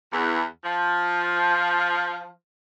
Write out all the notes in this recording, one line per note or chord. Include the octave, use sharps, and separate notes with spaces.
E2
F3